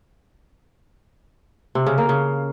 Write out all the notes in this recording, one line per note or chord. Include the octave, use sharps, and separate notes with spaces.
C3
C#3
A#3
C#3